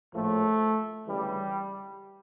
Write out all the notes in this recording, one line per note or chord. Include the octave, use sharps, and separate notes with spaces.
A#1 A2 F3 A3
D2 C#3 E3 G3